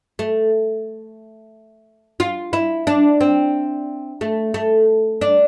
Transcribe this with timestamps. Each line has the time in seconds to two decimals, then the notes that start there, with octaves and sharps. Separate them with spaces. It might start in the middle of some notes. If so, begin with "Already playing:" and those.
0.19 A3
2.20 F4
2.53 E4
2.87 D4
3.21 C4
4.21 A3
4.54 A3
5.21 D4